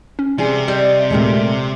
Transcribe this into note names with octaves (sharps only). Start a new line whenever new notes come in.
C#4
C3 G3 G#4 G#5
G3 D#5
D#2 A#2 G#3 A3 C4 A#4